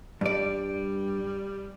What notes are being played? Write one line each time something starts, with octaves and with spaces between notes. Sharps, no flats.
G2 G3 D5